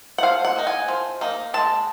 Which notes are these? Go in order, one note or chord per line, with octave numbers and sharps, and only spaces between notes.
F#5
F3 F5
F#5
A#3 D#4
G#5
F3
A#3 D#4
G#3 A5